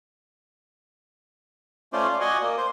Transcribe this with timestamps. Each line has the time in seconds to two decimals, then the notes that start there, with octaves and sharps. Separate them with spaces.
1.93 A3 C#4 F4 C5 D5
2.08 F4
2.21 F#4 D5 D#5 F#5 G#5
2.42 A#3
2.58 C5